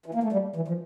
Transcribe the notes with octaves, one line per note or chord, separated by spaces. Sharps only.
E3
A#3
A3
G3
E3
F3